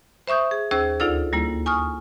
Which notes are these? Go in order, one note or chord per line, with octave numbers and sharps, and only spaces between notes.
C5 E5 C#6 D#6 G6
G#4
D#2 C#4 G#4 C5 E6
D2 D#4 F4 A4 D5 E6
G3 A#3 E4
G#5 C#6 D#6 F6